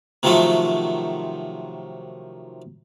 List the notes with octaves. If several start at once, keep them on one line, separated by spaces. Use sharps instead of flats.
C3 D#3 F3 F#3 A3